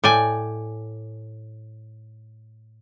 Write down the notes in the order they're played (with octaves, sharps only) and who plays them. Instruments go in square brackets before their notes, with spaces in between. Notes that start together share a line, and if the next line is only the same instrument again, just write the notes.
[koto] A2 D5 G5 G#5